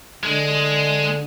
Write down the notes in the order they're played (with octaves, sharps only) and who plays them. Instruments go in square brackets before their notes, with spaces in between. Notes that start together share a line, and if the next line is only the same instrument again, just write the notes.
[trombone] D3 [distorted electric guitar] G#3